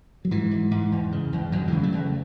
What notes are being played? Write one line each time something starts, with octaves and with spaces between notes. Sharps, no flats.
F#3
G#2 E3
G#2
G#2
E2
C#3
E2
E2 D#3 F#3
C#3 E3 G#3
F#3 A3
E2